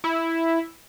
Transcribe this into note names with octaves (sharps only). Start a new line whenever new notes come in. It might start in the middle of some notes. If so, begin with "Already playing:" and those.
E4